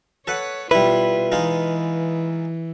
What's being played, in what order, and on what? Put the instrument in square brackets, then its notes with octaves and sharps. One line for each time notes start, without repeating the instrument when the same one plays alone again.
[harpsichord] A4 B4 F#5 [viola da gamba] C#5
[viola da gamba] B2 F4 [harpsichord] G3 E4 [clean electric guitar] B4
[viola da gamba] E3 [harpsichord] G#3 D#4 F4